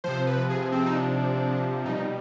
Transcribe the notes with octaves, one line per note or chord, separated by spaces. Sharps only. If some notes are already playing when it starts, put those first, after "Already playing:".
C3 F3 C5
B4
G#4
C4
D#4
D4
B2 G3 D#4